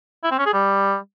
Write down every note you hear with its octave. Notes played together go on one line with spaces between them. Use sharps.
E4
C4
C#4
G#4
G3